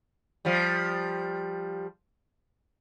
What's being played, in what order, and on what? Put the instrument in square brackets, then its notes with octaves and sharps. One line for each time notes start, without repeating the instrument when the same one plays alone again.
[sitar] F3 G3